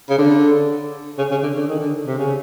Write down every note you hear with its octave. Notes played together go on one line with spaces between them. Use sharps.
C#3
D3
C#3
C#3
D3
D3
D#3
D3
C3
C#3